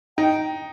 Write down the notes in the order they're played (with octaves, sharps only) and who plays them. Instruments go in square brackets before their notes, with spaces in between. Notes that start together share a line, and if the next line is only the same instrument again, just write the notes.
[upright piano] D#4 [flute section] G5